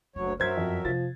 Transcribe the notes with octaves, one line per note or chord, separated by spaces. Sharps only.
F#1 D2 F#3 C#5
F#2 F#3 A#4 C5 E5 G#6
F2
C3 F3 A6